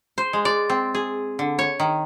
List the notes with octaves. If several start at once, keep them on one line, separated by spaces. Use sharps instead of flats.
C5
G#3
D5
C4
G#4
D3
C#5
D#3